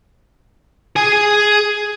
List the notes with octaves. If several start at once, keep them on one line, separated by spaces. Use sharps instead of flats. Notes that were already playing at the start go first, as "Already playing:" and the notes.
G#4 G#5